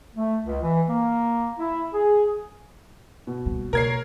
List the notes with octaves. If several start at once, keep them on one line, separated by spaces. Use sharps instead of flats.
A3
C#2
E3
A#3
E4
G#4
B2
G3 A#3
B2 A#3 A#4 C#5 G#6 C7